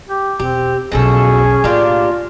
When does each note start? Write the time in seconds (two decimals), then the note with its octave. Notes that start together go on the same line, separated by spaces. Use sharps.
0.09 G4
0.39 E1 C4 G4
0.92 B1 E2 B2 F3 C#4 G#4 A4
1.64 A2 A#3 D4 F4 G4